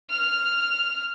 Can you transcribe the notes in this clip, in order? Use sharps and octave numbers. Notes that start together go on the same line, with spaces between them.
F6